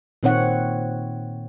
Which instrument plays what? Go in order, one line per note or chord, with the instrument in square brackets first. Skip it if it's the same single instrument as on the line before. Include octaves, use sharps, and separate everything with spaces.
[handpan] A#2 D#3 C4 D#4 C#5 F#5